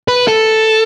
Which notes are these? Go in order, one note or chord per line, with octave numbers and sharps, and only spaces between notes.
B4
A4